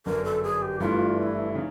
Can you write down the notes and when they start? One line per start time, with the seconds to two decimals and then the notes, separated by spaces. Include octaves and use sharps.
0.06 G1 F#2 D3 A#4
0.25 A4
0.43 G#4
0.62 G4
0.80 G2 E3 A3 D4 F4
1.18 F4
1.23 E4
1.55 C#3 D#4